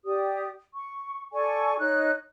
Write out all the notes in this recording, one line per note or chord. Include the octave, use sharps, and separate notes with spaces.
G4 D5 D#6
C#6
A4 D5 G#5 C#6
D#4 C#5 F#6